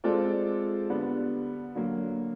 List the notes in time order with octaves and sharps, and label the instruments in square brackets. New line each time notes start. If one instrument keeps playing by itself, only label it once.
[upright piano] G#3 C4 F4 A4 D5
D3 G3 B3
D3 F#3 A#3